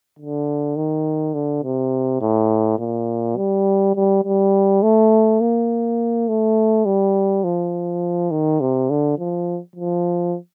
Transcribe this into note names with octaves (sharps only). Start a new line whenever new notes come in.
D3
D#3
D3
C3
A2
A#2
G3
G3
G3
A3
A#3
A3
G3
F3
D#3
C3
D3
F3
F3